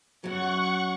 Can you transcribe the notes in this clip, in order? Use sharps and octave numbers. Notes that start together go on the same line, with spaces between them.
F#2 F#3 F#5 C#6